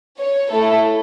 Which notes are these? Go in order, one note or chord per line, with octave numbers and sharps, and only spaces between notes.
C#5
A3 E4 A4